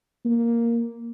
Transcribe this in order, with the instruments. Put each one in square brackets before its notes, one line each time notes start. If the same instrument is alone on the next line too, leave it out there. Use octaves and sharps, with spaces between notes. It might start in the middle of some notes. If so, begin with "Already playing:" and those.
[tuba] A#3